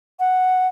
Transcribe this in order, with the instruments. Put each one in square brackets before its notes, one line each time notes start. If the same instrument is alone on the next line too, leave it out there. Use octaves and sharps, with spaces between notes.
[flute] F#5